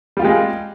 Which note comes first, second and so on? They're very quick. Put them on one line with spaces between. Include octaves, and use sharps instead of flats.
G3 F4 G4 G#3